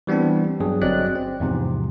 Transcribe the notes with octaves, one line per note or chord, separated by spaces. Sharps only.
E3 G3 B3 C4 D4
G2 F#3 G#4
G1 F#3 C4 D5 D#5 F#6
C4
E2 G#2 C3 F3